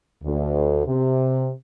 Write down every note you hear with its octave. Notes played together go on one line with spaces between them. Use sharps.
D2
C3